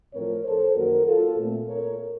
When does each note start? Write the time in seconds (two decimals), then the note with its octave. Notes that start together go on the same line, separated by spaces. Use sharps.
0.14 A2 F3 A3 C4 A#4 C#5
0.44 A4 C5
0.75 F#2 D#3 A#3 F#4 A#4
1.06 F4 A4
1.37 A#2 A3 C4
1.68 A#4 C#5